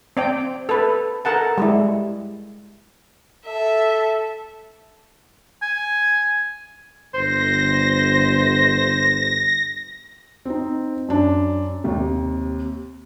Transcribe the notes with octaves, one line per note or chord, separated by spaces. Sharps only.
C4 D5 G5
A4 B4
A4 A#4 F#5 A5
G3 G#3 E4
A4 E5
G#5
G1 C5 A#6
C4 D#4
F#2 D4
D#2 C3